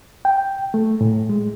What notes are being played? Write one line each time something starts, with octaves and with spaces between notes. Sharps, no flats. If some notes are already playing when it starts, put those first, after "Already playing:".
G5
A3
A2
G#3